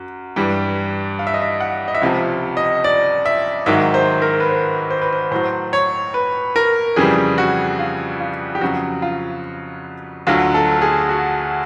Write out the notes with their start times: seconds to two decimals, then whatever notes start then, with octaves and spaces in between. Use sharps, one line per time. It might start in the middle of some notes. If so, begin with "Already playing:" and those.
Already playing: F#2
0.36 G2 E3 G3
1.19 F5
1.27 E5
1.34 D#5
1.42 E5
1.60 F#5
1.88 D#5
1.95 E5
2.01 C#2 C3 F3 F5
2.57 D#5
2.84 D5
3.26 E5
3.66 G#2 D#3 F#3 E5
3.94 C5
4.22 A#4
4.40 B4
4.49 C5
4.90 C5
5.01 B4
5.12 C5
5.31 A2 F#3 C5
5.73 C#5
6.14 B4
6.56 A#4
6.96 F2 C#3 E3 G3 G#4
7.38 F#4
7.79 F4
8.21 F4
8.55 G4
8.61 F2 C#3 F#3 F#4
9.02 F4
10.27 D2 D3 F#3 F4
10.54 A4
10.82 G#4
11.09 F#4